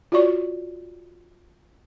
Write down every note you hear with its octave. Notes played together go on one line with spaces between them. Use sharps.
F4 F#4 C#5 D5 C#6